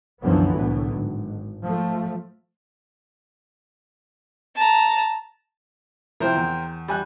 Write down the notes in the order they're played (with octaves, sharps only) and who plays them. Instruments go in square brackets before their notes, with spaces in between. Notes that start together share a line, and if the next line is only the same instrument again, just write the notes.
[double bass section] C2 F#2 D3 E3 F3 B3
C2 A2 D3 F#3 B3
G#1
F3 A3
[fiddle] A5 A#5
[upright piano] C3 F3 E4 [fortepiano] A#4 C5 G5
[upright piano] E2
[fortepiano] G3 G#5 F#6